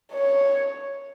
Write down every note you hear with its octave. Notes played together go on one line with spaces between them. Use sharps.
C#5